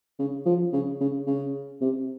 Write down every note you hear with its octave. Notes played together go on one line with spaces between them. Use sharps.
C#3
F3
C#3
C#3
C#3
C3